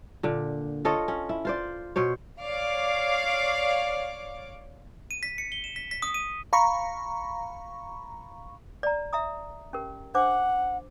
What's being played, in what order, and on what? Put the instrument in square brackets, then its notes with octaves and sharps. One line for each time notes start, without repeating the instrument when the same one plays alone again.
[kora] A#2 D3
F4 A4 C#5 D#5
C#4
E4
F4 C5 D5
B2 C5 C#5
[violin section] C#5 D5 F5 D6
[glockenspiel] D#7
B6
C#7
G7
E7
B6
B6
D#6
D#7
[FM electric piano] F5 A#5 B5 C#6
[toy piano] D5 A#5
E5 A#5 D#6
C#4 G4 A#4
[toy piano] D4 C5 D6 [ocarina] F#5